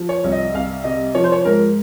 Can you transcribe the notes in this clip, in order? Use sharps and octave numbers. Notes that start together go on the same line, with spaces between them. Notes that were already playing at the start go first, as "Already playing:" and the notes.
Already playing: F3
C#5
C2
D#5
C2 F5
C3 D#5
F3 C#5
C5
C#5
G#2 A#4